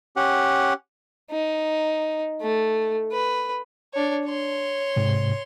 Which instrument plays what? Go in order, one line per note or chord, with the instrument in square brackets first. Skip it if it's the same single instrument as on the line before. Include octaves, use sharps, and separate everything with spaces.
[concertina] C#4 G4 F#5
[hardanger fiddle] D#4
A3
B4
D4 C#5
C#5 C6
[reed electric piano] G#2 C3